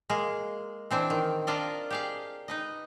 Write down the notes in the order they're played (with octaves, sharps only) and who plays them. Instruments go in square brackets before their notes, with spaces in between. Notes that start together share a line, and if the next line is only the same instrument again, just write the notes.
[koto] G#3 A#3 G#4
E3 C4 D4 G#5
D#3
D4 F4 A#4 D5 D#5
G4 G#4 F5
D#4 B4 D#5